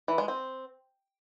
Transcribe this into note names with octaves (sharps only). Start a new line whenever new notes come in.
E3
G#3
C4